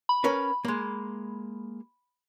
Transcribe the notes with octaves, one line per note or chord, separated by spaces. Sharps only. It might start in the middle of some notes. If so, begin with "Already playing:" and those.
B5
C#4 A#4 B4
G#3 A#3